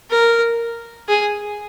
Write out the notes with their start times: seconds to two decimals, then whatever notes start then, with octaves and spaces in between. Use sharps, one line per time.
0.10 A#4
1.08 G#4